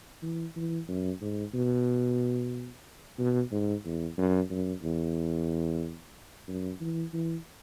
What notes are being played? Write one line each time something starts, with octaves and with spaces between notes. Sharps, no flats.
E3
E3
F#2
G#2
B2
B2
G#2
E2
F#2
F#2
E2
F#2
E3
E3